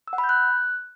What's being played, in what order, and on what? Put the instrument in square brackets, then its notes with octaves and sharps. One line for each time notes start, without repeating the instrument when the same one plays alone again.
[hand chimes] E6
F#5
B5
G6
F#6